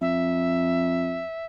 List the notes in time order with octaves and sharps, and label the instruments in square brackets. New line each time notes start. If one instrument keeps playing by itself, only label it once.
[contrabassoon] F2 [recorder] E5